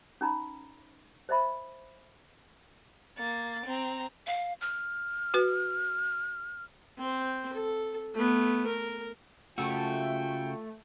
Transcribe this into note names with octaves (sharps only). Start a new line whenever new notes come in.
C#4 D#4 A#5 B5
C5 D#5 E5 B5
A#3 A6
C4 A#5
F5
F6
F#4 B4
C4 C5
A4
A3 B3
A#4
C#3 A3 F4 F#4 G5